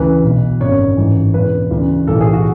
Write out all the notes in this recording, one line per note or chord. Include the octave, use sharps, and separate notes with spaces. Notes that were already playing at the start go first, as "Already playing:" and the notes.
Already playing: D2 C#3 E3 B4
B1 B2
G#1 F#2 D3 C#5
A1 G#2 E3
E1 E2 D3 B4
D2 C#3 E3
B1 A2 E3 A4
G#4
F#4